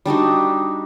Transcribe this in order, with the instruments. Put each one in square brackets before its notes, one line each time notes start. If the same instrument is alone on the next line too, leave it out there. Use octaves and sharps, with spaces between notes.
[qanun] G3 D4 D#4 F#4